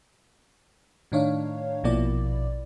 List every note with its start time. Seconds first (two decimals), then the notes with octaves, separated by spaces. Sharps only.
1.12 A2 D#3 D4 D#4 C#5 F5
1.84 A#1 B2 F3 A#3 E4 D5